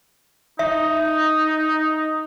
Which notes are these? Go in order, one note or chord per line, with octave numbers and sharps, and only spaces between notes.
D#4 E5